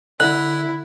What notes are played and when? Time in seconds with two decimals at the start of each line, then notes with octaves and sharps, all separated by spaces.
0.20 D3 E4 F#6